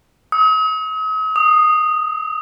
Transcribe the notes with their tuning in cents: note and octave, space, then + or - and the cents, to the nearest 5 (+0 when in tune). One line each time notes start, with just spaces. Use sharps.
D#6 +45
D#6 -10